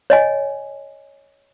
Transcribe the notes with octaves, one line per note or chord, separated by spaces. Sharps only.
C#5 D#5 G#5